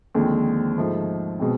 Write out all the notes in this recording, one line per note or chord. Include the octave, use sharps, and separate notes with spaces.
D#2 D3 F3 G#3 C4
G#2 F3 A3
B2 G#3 C4